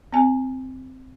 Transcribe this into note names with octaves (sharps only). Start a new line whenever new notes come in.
C4 G#5